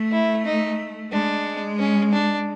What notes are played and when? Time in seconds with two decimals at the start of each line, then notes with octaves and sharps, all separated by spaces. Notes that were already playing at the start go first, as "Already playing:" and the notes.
Already playing: A3
0.12 E4
0.46 D#4
1.12 G#3 D4
1.79 C#4
2.13 D4